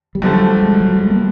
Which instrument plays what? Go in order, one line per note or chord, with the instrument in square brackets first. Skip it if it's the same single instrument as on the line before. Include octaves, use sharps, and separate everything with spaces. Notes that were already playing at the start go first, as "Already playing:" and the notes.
[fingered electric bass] G3
[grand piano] G2 D3 F3 A3 [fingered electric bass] F#3
[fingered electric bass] G3
G#3
F#3
G#3
A#3